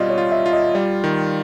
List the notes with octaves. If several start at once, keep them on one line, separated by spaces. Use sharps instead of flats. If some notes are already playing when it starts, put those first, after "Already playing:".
Already playing: B2 G3 C4 F4 D5 D#5
C#5
F4
E5
F4
D#5
G3 D5
D#3